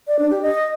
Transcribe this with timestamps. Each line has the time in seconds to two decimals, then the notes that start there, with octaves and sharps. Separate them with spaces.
0.08 D5
0.19 D4
0.30 G4
0.42 D#5